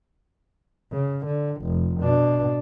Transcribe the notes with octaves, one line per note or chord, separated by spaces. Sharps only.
C#3
D3
F1
B2 D4